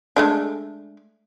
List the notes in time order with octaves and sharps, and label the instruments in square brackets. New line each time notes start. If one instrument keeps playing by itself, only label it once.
[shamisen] G#3 A3 D4